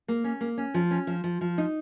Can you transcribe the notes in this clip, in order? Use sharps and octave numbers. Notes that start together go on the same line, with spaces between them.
A#3
C#4
A#3
C#4
F3
C#4
F3
F3
F3
D#4